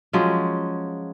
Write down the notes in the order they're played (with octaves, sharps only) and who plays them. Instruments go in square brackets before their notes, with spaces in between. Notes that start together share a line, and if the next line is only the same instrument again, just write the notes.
[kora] F3 F#3 G#3 C#4